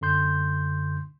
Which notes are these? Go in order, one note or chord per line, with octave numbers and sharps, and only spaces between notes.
F#2 D3 C6 G6